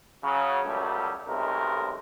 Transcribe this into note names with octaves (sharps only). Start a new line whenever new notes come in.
C#3 F#3
C#2 F#2 F#3 G3 A3
B1 C3 G#3 A3 A#4